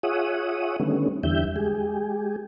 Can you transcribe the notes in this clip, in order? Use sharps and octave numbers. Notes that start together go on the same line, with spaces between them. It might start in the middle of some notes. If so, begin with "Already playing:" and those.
F4 G#4 C#5 E5 F#5 D#6
D3 D#3 G3 A3 B3 C#4
E2 D3 E3 G3 E5 G6
G#3 G4 G#4